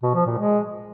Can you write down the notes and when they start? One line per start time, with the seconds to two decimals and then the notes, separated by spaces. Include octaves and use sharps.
0.03 B2
0.14 F3
0.26 A#2
0.38 G#3